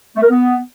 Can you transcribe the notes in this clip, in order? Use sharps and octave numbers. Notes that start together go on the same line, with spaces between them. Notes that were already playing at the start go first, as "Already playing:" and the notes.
A3
A#4
B3